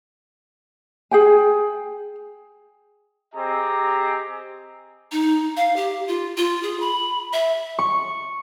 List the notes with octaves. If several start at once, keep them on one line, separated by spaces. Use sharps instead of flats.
G#4 G5 G#5
C4 G4 G#4 D#5 A#5
D#4
F5
G4
F4
F4
G#4
B5
E5
C#6